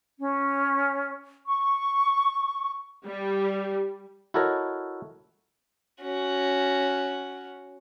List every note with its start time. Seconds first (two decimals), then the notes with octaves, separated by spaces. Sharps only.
0.19 C#4
1.46 C#6
3.05 G3
4.34 E4 F#4 A4 A#4 C#5 D#5
6.01 C#4 F#4